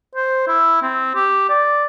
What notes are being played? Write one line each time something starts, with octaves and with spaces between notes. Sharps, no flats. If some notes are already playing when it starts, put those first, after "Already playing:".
C5
E4
C4
G4
D5